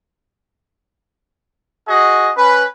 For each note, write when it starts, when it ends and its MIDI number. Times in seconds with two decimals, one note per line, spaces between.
1.88 2.31 66
1.88 2.31 68
1.88 2.31 75
2.37 2.64 61
2.37 2.64 71